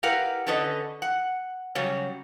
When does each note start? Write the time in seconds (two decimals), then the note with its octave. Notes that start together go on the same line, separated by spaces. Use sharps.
0.03 E4 G4 A#4 B4 F5 F#5
0.47 D3 C#4 A4 B4 D#5
1.02 F#5
1.75 C#3 F#3 G3 C#4